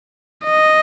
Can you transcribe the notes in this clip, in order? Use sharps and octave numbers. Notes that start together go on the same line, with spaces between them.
D#5